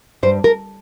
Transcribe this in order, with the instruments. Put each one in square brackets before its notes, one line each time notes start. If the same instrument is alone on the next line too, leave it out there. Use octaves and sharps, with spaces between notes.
[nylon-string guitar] G2 C5
A#4